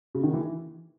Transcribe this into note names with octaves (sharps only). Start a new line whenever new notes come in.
C#3
D#3
E3